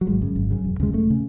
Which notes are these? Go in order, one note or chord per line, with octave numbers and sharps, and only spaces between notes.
F#3
G#1 G#3
F#2 C#3
G#1
F#2 C#3
E1
D#2 C#3 G#3
E1 A3
C#3